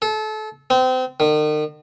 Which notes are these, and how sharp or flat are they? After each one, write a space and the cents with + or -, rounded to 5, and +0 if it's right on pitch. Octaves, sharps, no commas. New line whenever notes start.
A4 -30
C4 -30
D#3 -40